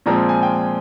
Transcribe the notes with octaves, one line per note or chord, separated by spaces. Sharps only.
A#2 F3 G#3 C4 A#5
G#5
G5
G#5